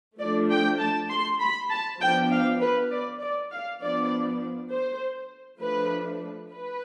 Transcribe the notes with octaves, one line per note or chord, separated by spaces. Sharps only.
F3 A3 D4 D5
G5
A5
C6
B5
A5
F3 B3 D4 G5
F5
B4
D5
D5
F5
F3 B3 D4 D5
C5
F3 A3 D4 B4
B4